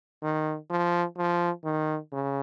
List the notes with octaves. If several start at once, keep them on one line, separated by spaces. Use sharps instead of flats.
D#3
F3
F3
D#3
C#3